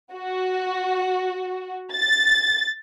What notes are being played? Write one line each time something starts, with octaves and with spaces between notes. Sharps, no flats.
F#4
A6